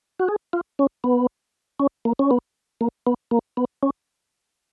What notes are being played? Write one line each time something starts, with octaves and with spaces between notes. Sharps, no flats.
F#4
G#4
F4
C#4
B3
C#4
A#3
C#4
B3
A#3
B3
A#3
B3
C#4